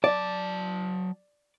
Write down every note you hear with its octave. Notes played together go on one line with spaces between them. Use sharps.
F#3 D5 A5